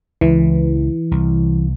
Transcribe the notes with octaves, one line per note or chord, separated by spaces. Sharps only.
C#2 E3
C2